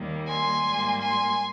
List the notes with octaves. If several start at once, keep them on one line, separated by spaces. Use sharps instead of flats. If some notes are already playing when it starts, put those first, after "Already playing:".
Already playing: D#2 D#3 G3 A#3
G#5 C6
G#2 G3 A#3
G#5 C6